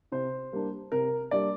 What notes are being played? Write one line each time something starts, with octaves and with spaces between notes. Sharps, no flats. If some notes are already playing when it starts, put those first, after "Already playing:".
C3 C5
G3 A#3 D4
C3 A#4
G3 A#3 D4 D5